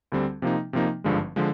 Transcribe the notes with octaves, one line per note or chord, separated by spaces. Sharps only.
D2 D3 G3 C4
C3 F3 A#3 D#4
C3 F3 A#3 D#4
G#1 G2 D3 F3 G#3
D3 F3 G#3